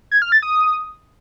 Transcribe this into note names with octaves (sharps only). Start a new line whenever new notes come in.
G#6
F6
A6
D#6